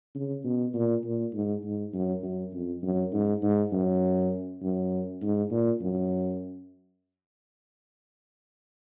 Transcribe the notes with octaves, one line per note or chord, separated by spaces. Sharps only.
C#3
B2
A#2
A#2
G#2
G#2
F#2
F#2
F2
F#2
G#2
G#2
F#2
F#2
G#2
A#2
F#2